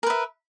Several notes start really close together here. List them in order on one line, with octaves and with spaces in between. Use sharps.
A#4 B4 E5